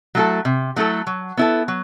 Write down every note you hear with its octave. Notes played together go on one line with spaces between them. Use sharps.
F#3 A3 E4 A4
C3
F#3 A3 E4 A4
F#3
B3 E4 A4
F#3